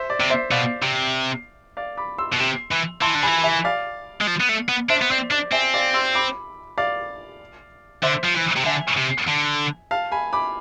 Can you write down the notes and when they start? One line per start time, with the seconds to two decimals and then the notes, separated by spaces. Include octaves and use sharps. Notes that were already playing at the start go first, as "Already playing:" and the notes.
Already playing: C5 E5
0.10 D5
0.20 C3
0.30 C5 E5
0.51 B2 D5 F5
0.83 C3
1.77 D5 F5
1.97 B5 D6
2.18 C6 E6
2.33 B2
2.40 C3
2.71 E3
3.01 E3 A5 C6
3.15 D3
3.23 E3 G#5 B5
3.43 E5 G#5
3.64 D5 F5
4.21 G#3
4.27 F3
4.40 B3
4.49 A3
4.69 B3
4.90 D4 C5 E5
5.02 B3
5.11 C4 D5
5.31 D4 D5
5.52 C4 E5 G#5
5.74 D5 F5
5.94 C6 E6
6.15 B5 D6
6.78 D5 F5
8.03 D3 C5 E5
8.24 F3
8.35 E3
8.57 C3
8.65 D3 E5 G#5
8.98 C3
9.28 D3
9.91 F5 A5
10.12 G#5 B5
10.33 B5 D6